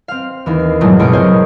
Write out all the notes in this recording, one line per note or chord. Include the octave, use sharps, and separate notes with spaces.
C4 F5
D#2 E3
C7
E2 G2 A#2 F#3 G#3 A3
C#2 B2 A3 C#4 C7 D7
C4 A#4 C5 C#5 D#5